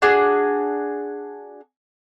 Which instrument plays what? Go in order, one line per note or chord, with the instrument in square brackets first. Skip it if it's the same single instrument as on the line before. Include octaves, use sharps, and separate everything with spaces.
[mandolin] D4 F#4 G#4